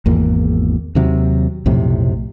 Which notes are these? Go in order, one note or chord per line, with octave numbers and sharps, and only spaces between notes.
G#1 E2 A#3
D#2 C3 F#3
B1 F2 A2 C3